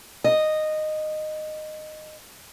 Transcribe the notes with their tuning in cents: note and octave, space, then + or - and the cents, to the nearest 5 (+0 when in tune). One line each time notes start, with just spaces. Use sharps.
D#5 -10